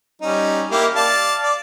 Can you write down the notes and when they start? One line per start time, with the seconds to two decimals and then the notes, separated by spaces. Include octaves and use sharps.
0.22 G3 C#4 D#4
0.71 A#3 E4 G4
0.95 D5 F5 A5
1.42 D5